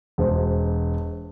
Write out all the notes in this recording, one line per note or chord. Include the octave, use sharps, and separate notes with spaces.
E1 C5